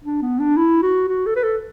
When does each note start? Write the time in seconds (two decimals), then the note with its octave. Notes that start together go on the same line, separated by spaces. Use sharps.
0.05 D4
0.22 B3
0.39 D4
0.57 E4
0.82 F#4
1.08 F#4
1.26 A4
1.36 B4
1.43 A4